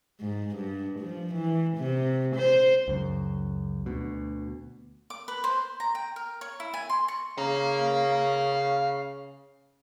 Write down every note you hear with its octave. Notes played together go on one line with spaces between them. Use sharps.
G#2
G2
F3
E3
C3
C5
C#2 F#2
D2 B2
D6
B4
C5
A#5
G5
A#4
C#5
E4
G#5
C6
C#6
C#3 F5 A#5